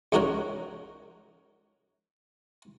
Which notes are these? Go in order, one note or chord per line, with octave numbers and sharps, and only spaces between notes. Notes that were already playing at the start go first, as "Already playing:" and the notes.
C#2 F3 D#4 F#4 A#4 C#5